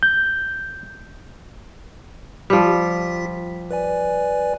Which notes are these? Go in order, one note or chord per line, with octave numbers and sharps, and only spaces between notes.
G6
F3 G3 F4 B6
B4 D5 G#5